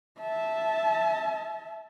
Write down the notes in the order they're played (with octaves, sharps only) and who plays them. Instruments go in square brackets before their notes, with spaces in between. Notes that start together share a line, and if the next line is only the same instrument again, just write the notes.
[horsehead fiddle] E5 A5